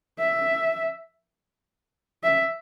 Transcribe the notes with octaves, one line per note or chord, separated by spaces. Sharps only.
E5
E5